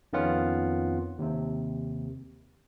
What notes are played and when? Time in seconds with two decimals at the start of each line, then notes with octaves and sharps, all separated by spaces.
0.13 F2 D#3 B3 C#4 F4 F#5
1.19 D#2 C3